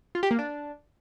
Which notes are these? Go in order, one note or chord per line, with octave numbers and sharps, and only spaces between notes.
F4
G4
A#3
D4